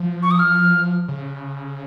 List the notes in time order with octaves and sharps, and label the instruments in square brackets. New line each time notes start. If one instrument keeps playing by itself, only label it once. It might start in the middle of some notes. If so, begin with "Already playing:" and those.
Already playing: [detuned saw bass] F3
[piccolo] C#6
D#6
F6
[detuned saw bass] C#3